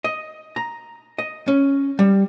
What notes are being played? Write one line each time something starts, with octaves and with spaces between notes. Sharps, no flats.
D#5
A#5
D#5
C#4
G3